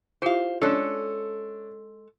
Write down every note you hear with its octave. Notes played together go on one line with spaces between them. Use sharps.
E4 F4 G4 C5 F5
G#3 C#4 D4 A4